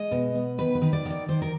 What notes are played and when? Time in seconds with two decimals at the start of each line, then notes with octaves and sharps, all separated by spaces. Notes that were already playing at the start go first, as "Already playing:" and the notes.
Already playing: G#3 D#5
0.11 B2
0.35 B3
0.58 D#3 B4
0.75 B4
0.82 D#3
0.93 D5
1.05 D#3 D5
1.28 D#3 C5
1.42 A#4